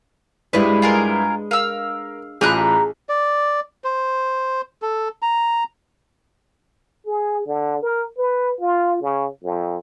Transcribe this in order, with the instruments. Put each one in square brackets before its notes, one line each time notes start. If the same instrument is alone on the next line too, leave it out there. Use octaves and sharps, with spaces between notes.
[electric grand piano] G2 E4 G4 [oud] G#3 D4 B4
[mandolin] F4 G#4 A#4
[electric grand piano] A#4 [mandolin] F5 E6
[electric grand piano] A1 F4 B5 [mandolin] G4 A#5 F#6 [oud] G#4
[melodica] D5
C5
A4
A#5
[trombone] G#4
D3
A#4
B4
F4
C#3
F2